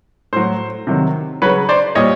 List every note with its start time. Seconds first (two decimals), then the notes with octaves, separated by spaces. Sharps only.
0.33 A2 F#3 C5
0.87 C3 D#3 F#3
1.42 C#3 F#3 B4 C#5
1.69 C5 D5
1.95 A#2 G3 C#5 D#5